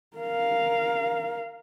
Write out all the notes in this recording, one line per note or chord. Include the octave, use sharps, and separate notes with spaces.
A#4 F5